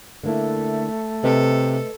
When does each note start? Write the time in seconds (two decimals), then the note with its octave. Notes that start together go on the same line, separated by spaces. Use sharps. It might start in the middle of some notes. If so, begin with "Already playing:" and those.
0.23 D3 A3 A#3 E4
1.24 C3 A4 B4 D#5